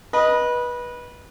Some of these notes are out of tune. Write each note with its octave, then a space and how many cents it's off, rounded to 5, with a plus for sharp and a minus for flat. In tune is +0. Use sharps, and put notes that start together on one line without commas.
B4 -20 D#5 +0